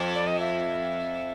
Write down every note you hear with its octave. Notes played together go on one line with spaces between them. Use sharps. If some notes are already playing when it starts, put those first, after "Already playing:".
Already playing: F2
D5
D#5
E5